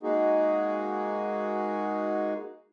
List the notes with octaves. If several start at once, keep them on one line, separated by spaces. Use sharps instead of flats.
G#3 A#3 D#4 F#4 G#4